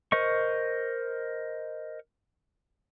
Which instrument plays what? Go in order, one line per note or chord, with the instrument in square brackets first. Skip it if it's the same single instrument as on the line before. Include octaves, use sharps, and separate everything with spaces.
[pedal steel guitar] A#4 C5 D#5 C#6